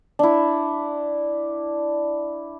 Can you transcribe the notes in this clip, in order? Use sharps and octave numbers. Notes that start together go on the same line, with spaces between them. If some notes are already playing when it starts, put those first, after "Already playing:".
D4 E4